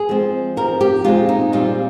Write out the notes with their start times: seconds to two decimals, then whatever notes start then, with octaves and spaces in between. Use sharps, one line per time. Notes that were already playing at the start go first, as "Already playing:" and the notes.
Already playing: G#4
0.09 F3 G#3 C4
0.57 F3 C4 A#4
0.81 G4
1.04 A#2 G#3 C4 F4
1.29 D#4
1.52 A#2 G3 C4 F4